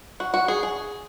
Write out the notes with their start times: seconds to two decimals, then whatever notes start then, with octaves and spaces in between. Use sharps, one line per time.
0.20 F#4
0.34 F#4
0.48 G#4
0.63 G#4